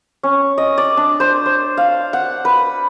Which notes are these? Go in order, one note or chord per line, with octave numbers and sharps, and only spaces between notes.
C#4
D#5
D5
D4
C5
C5
F5
F#5
B4